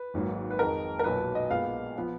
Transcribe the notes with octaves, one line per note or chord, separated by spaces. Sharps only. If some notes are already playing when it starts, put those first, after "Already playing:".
Already playing: B4
G#1 G#2 F#3 A#3
B4
F2 D#3 G#3 A#4
A#4
B1 A#2 F#3 B4
D#5
A#1 A#2 G#3 B3 F5
F3 B3